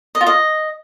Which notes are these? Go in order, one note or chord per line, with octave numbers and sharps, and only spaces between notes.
D#5
F4
D#5